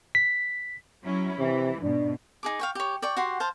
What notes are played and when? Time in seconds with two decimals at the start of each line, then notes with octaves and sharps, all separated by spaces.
0.15 B6
1.03 F#3 C#4 E4
1.38 C3 E3
1.82 G#2 B2 D4
2.43 D#4 G#4 D6
2.59 F5 G5 C#6
2.75 G4 C#5
3.02 D5 G5 C#6
3.17 F#4 G4 F#5 C6
3.40 C5 F5 A5